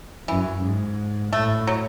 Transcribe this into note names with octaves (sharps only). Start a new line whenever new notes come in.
F#2 E3
G#2
A2 A3
F#3